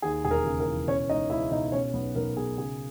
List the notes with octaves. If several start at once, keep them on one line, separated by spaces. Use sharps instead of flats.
D#2 G#4
E1 G#4
A#4
C#3
A#4
E3
B2 C#4 C#5
C#2 D#4 D#5
C#2 E4 E5
B2 D#4 D#5
B2 C#4 C#5
B1 B3 B4
B1 A#4
B2 G#4
C#3 G#4